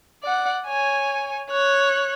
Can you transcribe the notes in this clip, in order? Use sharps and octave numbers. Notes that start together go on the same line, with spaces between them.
D5 F#5
C#5 G#5
C#5 F#6